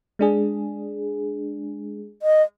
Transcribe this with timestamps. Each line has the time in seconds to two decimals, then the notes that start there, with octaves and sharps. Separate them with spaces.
0.19 G#3 D4 G#4
2.22 D#5